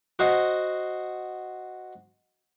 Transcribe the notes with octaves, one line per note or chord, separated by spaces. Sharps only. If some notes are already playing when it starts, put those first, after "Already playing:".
F#4 C5 D#5 F#5